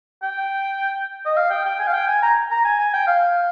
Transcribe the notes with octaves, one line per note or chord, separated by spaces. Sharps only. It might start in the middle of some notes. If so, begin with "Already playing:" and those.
G5
D#5
F5
G5
G5
G#5
F5
G5
G#5
A#5
A#5
G#5
G#5
G5
F5